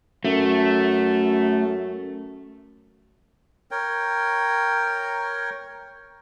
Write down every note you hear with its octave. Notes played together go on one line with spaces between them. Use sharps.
F#2 A3
A#4 C#5 G5